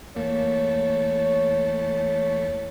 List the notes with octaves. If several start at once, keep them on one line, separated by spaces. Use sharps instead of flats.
E2 A3 A#3 C#5